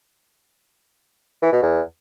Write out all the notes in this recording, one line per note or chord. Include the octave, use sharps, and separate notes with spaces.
E3
B2
E2